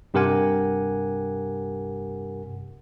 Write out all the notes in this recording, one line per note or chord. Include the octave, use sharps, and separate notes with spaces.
G2 C3 G4 A#4 F#5 G#5